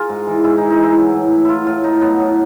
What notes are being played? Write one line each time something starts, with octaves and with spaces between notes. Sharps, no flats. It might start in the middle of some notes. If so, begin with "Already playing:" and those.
Already playing: F4 G#4 A#4
G#2
E3
G#2 E4
E3 D#4
D#4
E3 E4
F#3
A2
F#3
F#3 E4 F4
A2 F4
A2 D#4
F#3 B3
A2